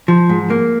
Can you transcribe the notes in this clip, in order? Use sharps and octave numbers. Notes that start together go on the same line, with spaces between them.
F3
G#2
A#3